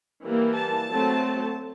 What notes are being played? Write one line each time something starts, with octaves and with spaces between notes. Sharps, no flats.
E3 G3 A#3
A5
F#3 A3 C4